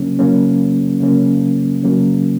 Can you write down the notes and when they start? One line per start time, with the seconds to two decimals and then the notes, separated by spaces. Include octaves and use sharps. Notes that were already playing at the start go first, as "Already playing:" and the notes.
Already playing: C#3 F#3 A#3 C#4
0.19 C#3 F#3 A#3 C#4
1.00 C#3 F#3 A#3 C#4
1.83 C#3 F#3 A#3 C#4